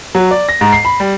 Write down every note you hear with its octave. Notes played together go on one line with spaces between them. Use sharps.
F#3
D5
A#6
G#2
C7
B5
G3